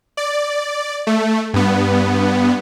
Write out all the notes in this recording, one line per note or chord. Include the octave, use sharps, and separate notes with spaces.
D5
A3
G2 B3